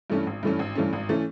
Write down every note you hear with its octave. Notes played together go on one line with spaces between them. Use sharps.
G2 E3 A3 C#4
G#1
G2 E3 A3 C#4
G#1
G2 E3 A3 C#4
G#1
E3 A3 C#4